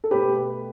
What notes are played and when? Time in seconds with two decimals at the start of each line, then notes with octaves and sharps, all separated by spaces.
0.04 A4
0.11 B2 A3 G4 B4